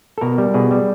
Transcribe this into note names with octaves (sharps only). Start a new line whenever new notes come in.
A4
B2 A#4
G3
B2 G#4
G3